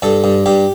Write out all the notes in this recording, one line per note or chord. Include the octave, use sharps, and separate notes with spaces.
G2 A4
G2
G2 G4